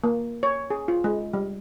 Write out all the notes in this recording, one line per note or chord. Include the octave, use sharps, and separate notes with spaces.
A#3
C#5
G#4
F4
G#3
G3